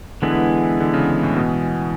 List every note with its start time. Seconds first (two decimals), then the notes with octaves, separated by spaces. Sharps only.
0.22 D3 E3 G#3 B3 E4 G#4
0.80 D3
0.94 C#3
1.23 A2
1.36 B2